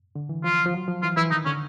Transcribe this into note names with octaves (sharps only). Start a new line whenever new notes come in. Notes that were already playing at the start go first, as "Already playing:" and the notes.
D3
E3
F3 F4
F3
F#3
F3
E3 F4
E3 E4
D#3 D#4
D3 C#4